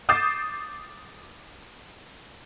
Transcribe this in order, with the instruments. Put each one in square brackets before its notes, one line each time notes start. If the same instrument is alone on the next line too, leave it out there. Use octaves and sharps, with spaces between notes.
[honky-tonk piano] D6 D#6 G6 A6 C7 E7